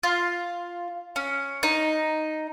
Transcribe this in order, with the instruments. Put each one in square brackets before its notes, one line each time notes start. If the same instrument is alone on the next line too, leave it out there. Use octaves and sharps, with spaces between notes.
[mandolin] F4
C#4
D#4